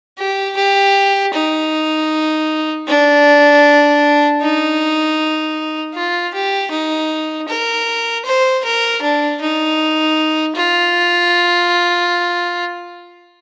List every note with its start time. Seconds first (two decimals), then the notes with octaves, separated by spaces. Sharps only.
0.18 G4
0.56 G4
1.33 D#4
2.87 D4
4.42 D#4
5.94 F4
6.34 G4
6.71 D#4
7.48 A#4
8.25 C5
8.64 A#4
9.02 D4
9.41 D#4
10.56 F4